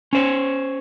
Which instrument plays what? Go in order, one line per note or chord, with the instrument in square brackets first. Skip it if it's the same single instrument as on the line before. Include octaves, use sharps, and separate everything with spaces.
[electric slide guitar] C#4 C5 C#5